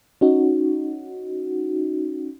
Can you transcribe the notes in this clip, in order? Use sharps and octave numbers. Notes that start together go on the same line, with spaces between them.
C#4 D#4 F#4